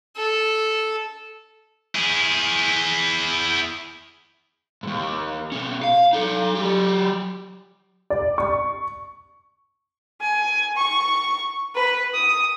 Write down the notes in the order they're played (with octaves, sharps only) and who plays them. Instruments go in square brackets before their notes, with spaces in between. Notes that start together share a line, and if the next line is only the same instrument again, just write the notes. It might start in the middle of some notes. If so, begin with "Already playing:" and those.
[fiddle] A4
[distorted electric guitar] E4 G#4
[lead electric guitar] D#2 G#2
B2 C#4
F5
D#4 A4
F#3 G4
[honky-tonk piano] D5
C#6
[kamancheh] G#5
C#6
B4
D#6